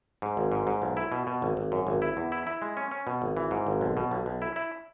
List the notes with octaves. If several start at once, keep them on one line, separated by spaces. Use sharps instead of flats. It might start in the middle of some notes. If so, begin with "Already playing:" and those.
G#2
G#1
G#2
G#2
B1
E4
B2
B2
G#1
G#1
F#2
G#1
E4
E2
E4
E4
G#3
C#4
C#4
B2
G#1
E3
G#2
G#1
B1
B2
B1
B1
E4
E4